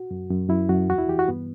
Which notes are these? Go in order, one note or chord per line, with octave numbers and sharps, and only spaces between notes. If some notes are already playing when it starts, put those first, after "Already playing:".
Already playing: F#4
F#2
F#2
F#2 E4
F#2 F#4
E2 F#4
E4
E3 G4
F#4
G2 B3